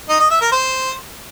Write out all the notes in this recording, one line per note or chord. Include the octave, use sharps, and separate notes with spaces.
D#4
D#5
E5
A#4
C5